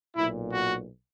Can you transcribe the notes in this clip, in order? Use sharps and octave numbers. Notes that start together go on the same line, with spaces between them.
B1 A#2 E4
F#4